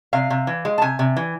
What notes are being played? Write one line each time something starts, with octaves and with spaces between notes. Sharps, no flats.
C3 F5
C3
E3
G#3
A5
C3 G#5
C3
E3